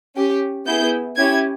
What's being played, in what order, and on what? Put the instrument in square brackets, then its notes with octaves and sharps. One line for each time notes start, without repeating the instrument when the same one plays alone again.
[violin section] C#4 G4
B3 E4 G#4 G6
C#4 E4 G4 G#6